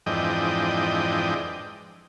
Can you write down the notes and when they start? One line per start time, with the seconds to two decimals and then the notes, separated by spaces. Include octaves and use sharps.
0.06 F2 G#2 E3 D4 D#5 G5